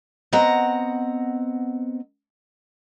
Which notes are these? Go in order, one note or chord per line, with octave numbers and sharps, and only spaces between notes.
B3 C4 D#5 F#5 A#5